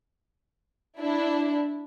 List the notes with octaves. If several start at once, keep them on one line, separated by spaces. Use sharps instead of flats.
D4 E4